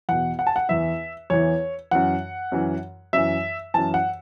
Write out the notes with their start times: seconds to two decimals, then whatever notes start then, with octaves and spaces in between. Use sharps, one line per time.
0.09 E2 B2 F#5
0.39 F#5
0.47 A5
0.56 F#5
0.69 E2 E3 E5
1.30 E2 E3 C#5
1.91 F#2 E3 F#5
2.52 F#2 E3
3.13 F#2 E3 E5
3.74 F#2 E3 A5
3.94 F#5